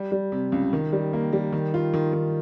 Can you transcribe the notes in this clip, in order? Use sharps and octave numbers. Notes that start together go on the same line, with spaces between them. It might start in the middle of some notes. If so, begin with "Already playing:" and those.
Already playing: G3
G3
C3
C#2
D#3
G3
A#3
G3
D#3
F4
D#3
D#3